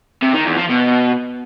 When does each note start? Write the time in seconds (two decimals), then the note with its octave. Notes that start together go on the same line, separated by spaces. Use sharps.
0.23 C3
0.34 D#3
0.46 E2
0.58 F3
0.70 B2